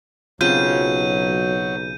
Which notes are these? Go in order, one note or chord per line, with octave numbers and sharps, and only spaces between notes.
B1 C#3 F#3 C4 F4 G6 D#7